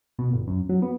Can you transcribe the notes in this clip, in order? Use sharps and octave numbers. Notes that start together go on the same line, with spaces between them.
B2
G1
F#2
F#3
B3